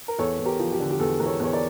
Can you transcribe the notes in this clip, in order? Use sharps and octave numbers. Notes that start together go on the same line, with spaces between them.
A#4
E2 A4 C#5
E2
G4 A#4
F3
G4
D3
G4
E2 A4
E2 A#4
A4 C#5
E2 C#5
A#4 D5